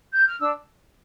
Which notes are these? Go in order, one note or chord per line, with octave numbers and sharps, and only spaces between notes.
G6
F6
D4 E6